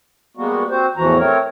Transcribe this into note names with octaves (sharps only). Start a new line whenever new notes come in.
G3 G#3 A#3 B3 F#4
C4 F#4 C5
E2 A2 E3 F3 F#4 A#5
A3 C4 A#4 C#5